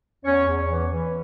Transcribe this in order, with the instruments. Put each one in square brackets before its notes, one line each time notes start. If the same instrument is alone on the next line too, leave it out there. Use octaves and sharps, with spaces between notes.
[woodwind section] E2 C#4 C#5
E2
E3
E3